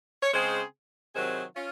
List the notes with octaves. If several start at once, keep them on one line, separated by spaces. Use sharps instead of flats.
C#5
C#3 G#3 C4 G#4 C5
C3 D#3 F#3 C4 G#4 C5
C#4 F4